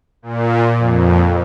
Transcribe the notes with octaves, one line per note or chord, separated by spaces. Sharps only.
A#2
F2